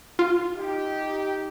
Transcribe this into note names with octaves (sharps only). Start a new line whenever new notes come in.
F4
D#4 G4